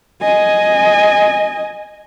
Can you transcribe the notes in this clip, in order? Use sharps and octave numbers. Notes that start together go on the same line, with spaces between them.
D#5 G#5